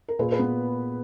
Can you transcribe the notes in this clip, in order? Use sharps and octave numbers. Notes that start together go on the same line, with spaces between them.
A#4
A#2 G#4 B4
G#4 B4
B3